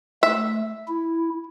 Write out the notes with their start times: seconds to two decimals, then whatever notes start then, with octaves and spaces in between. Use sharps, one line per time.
0.23 A3 E5
0.88 E4